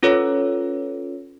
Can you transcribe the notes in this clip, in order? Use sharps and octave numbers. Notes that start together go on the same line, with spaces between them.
C#4 F4 A4 B4 C#5